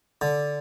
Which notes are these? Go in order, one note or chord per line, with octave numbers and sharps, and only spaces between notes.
D3